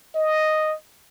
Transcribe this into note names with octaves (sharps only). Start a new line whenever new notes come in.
D#5